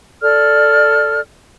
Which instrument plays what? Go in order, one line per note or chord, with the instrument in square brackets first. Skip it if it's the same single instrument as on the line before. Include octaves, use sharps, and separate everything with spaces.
[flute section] A4 D5 F6